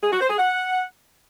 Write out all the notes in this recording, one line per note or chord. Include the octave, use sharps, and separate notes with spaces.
G#4
F#4
C5
G#4
F#5